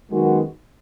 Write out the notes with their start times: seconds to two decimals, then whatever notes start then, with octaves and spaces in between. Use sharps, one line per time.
0.10 F#2 D#3 G#3 B3 F#4